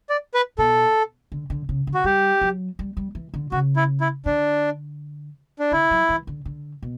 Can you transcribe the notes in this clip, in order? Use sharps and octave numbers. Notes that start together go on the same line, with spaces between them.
D5
B4
B2 A4
D3
D3
C#3
D3
F#4
G3 G4
F#3
G3
G3
E3
D3
C#3 F#4
E4
E4
D3 D4
D4
D3 E4
F#3
E3
D3
D3
B2